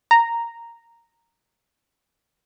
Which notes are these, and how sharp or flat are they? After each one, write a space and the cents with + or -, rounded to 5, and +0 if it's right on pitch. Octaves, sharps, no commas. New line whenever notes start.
A#5 -5